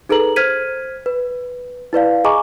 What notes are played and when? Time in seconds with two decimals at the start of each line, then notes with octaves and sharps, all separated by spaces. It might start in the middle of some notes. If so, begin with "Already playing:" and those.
0.09 D#4 G#4 A4 B4 A#5 F#7
0.36 C5 F6 G#6 B6 D#7
1.06 B4
1.93 E4 B4 D5 F5
2.24 G#4 D#5 G#5 A#5 C#6 D6